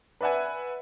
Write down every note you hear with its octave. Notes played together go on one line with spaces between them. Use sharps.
B4 D5 E5 F#5 G#5